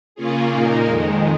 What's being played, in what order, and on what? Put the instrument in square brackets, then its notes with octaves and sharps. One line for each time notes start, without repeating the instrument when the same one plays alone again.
[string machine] C#3 A#3 C#4 F4 G#4
A#2 A#3 D#4 A#4
F2 D#3 G#3